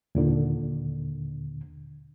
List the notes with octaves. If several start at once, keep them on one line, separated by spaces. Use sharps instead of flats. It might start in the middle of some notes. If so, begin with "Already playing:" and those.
D#2 A#2 D3